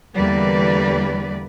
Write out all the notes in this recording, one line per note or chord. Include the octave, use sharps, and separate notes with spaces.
E2 D3 G3 A#3 B4 D5